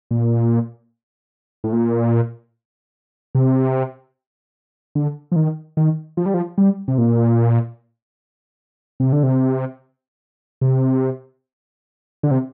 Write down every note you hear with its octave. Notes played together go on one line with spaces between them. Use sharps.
A#2
A2
A#2
C3
D3
F3
D#3
D#3
F3
G3
F3
G3
C3
A#2
C3
D3
C3
C3
D3
C3